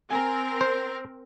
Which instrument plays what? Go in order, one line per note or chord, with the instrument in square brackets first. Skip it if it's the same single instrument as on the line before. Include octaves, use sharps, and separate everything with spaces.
[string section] C4 A#4 [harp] G#5 A#5
[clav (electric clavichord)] C5